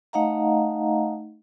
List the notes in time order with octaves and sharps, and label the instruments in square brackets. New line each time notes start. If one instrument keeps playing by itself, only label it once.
[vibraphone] A3 D#4 D#5 F5 F#5 A#5